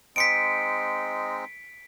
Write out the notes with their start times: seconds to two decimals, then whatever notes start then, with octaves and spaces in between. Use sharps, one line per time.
0.16 G#3 C4 D#4 B6 C#7 D7